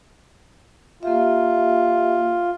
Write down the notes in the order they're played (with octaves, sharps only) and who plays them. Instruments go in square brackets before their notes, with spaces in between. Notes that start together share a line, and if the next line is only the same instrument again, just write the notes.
[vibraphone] A#3 G4 E5 [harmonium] F4